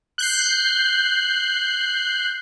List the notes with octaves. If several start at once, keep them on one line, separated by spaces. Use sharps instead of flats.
F#6 G6 C7